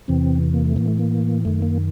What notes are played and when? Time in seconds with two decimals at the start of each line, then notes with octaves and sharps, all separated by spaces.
0.08 E2 C3 E3 C4
0.54 A#3
0.65 A3
0.76 A2 E3 A#3
0.88 A3
0.99 A#3
1.45 F#2 D#3 A3
1.62 A#3